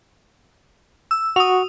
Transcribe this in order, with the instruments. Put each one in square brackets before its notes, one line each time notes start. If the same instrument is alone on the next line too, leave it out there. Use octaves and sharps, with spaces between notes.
[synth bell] E6
[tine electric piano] F#4 [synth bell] D#6 F7